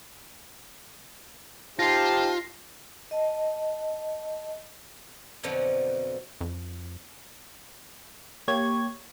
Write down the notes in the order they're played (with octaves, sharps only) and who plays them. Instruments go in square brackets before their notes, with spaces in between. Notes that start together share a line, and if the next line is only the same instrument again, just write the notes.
[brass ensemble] D#4 G4 C5 [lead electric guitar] F4 [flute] A5 [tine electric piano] A#6 C7
[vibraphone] D#5 A5
[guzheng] F2 B2 D3 F3 F#3
[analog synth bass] F2
[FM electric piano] A#3 G4 C#5 G#6